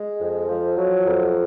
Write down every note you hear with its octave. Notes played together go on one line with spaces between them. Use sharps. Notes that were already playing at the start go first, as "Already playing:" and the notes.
Already playing: G#3
F2
F3
F#3
F2